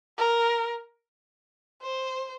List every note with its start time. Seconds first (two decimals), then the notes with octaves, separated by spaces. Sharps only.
0.18 A#4
1.82 C5